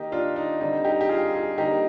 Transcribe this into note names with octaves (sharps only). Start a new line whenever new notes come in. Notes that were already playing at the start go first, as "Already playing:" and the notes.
Already playing: D#3 A#3 D#4 G4
D4 F4
D#4
D3 G3 C4 D#4
D#4 G4
G4
F4 G#4
F4 G#4
D3 G3 A#3 D#4 G4